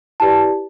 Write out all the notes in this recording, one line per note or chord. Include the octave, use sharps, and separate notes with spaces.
E4 G4 B4 D5 A5